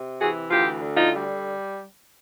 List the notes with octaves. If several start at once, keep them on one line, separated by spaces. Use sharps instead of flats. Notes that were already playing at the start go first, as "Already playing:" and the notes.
Already playing: C3
E3 F#4 G#4
D2 F4 G4
D3
D#4 F4
G3